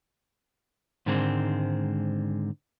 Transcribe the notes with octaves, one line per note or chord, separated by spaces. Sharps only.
G#2 D3 D#3 G#3 C4